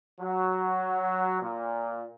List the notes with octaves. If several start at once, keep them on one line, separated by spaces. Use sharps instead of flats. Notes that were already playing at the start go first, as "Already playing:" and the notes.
F#3
A#2